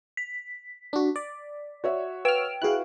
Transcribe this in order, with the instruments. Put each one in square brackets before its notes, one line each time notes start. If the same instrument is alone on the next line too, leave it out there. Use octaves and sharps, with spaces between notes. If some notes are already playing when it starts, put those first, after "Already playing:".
[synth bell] B6
[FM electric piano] D4 F#4
D5
[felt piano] F#4 C#5 E5
[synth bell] B4 G5 D7 [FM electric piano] E6 F6
[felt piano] E4 F#4 F5 [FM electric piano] G#4 F#6